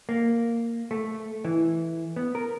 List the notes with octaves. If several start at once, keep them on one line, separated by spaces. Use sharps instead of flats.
A#3
A3
E3
B3
A#4